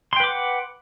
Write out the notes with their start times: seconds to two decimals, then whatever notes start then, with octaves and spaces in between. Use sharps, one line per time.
0.13 C6
0.16 G5
0.20 B4
0.24 D6
0.27 F#5